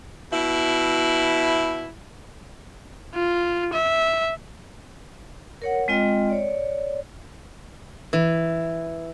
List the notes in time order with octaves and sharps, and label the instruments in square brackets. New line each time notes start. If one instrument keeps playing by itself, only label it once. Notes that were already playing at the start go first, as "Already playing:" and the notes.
[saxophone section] B2 E4
[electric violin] F4
E5
[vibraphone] A#4 C#5 F#5
G#3 C4 F4 D#5 G5
C#5 D5
[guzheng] E3